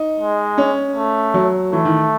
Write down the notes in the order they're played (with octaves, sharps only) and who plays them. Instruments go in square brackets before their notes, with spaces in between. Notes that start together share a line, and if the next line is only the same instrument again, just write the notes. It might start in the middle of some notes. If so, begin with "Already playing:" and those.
Already playing: [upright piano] D#4
[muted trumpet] G#3
[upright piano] C#4
[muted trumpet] A3
[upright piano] F#3
[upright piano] E3 [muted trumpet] A3
[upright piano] D#3